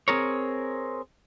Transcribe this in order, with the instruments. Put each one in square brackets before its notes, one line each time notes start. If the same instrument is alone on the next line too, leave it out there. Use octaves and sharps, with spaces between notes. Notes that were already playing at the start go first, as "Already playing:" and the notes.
[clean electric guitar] C4 G#4 A#4 C#5